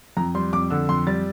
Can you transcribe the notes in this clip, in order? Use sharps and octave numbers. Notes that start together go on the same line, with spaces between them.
F2 A#5
G3 C6
F2 D6
D3 E6
F2 C6
G3 A6